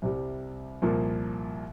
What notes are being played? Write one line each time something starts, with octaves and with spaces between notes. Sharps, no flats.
C2 C3 G3
C2 A#2 F3 A#3